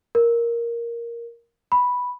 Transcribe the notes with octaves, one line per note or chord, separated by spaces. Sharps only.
A#4
B5